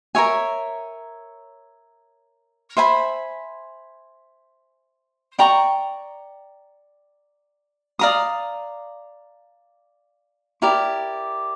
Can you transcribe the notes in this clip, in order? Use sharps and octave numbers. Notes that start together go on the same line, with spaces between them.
A#4 C#5 E5 G#5
C5 E5 G#5 B5
D5 G5 A#5 C#6
D5 F5 A#5 D#6
E4 G4 A#4 D5